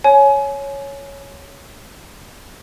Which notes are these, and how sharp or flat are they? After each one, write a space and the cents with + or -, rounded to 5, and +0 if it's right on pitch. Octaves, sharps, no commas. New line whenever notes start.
C#5 +0 G#5 +25